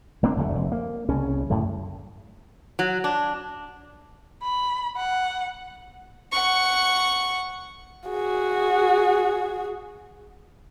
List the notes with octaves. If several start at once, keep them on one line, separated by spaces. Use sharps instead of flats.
F#1 A#3 C4 D4
F1 D2 A3
F1
A#3
C2 C#3 C#4
F#2 A2 D3
F#3
D4
B5
F#5
F#5 C#6
F#4 G#4